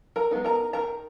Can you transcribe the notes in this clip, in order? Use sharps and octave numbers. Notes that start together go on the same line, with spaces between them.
A#4 A#5
G#3 B3 D#4
A#4 A#5
D#3 A#4 A#5